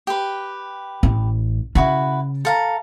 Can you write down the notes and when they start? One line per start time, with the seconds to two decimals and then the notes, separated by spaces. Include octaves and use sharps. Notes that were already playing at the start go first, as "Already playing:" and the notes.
0.07 G4 B4
1.03 A1
1.75 C#3 E4 F#4 B4
2.45 A4 F5 A#5